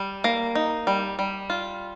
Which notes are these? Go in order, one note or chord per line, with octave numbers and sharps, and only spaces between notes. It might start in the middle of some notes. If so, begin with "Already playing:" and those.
Already playing: G3
A#3
D#4
G3
G3
F4